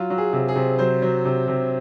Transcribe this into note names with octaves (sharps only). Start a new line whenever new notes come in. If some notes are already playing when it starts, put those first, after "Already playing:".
Already playing: F#3 F4
F#3
G#4
C3
G#4
C3
F#3 C5
F#3
C3
C3